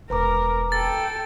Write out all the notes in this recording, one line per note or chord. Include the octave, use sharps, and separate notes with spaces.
E1 A#4 B4 A#5 D6
A4 G5 A6